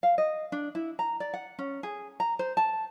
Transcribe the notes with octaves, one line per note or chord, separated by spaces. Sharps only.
F5
D#5
D4
E4
A#5
D5
F#5
C#4
G#4
A#5
C5
A5